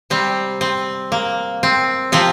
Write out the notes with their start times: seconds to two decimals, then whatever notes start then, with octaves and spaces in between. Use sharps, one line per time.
0.10 C3 G3 C4
0.61 C4
1.12 A#3
1.63 C4
2.12 C3 F3 C4